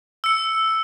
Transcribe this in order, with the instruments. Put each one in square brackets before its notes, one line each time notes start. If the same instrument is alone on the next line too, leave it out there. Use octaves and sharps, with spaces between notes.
[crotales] E6 C#7